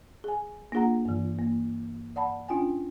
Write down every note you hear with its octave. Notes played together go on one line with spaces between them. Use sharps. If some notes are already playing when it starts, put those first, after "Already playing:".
G#4 G#5
A#3 D4 F4 G#4 F#5 A#5
G2 E3
A#3
D5 F#5 A5 B5
C#4 D4 F4 G5 G#5